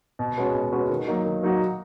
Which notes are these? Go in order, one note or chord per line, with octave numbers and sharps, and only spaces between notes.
B2
G#3 C#4 F#4 B4
B2
G#3 C#4 F#4 B4
D#3
F#3 A#3 D#4 F#4
D#3
F#3 A#3 D#4 F#4